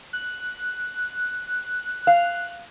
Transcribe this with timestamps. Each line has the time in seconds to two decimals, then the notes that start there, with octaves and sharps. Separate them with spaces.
0.13 F#6
2.07 F5